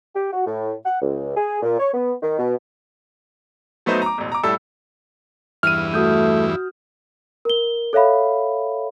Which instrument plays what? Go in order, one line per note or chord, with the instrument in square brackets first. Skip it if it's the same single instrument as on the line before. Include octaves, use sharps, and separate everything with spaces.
[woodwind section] G4
F#4
A2
F#5
C#2
G#4
A#2
C#5
B3
D#3
B2
[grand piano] F#3 A3 B3 D#4 C5
A#5 D6
E1 A1
A#5 D6
A2 G3 A4 E5 E6
[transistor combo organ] E2 G2 E4 [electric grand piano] F6 D#7
[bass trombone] A3 [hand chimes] F#4 D#6 G6
[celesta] A#4 G7
A4 C#5 E5 F5 B5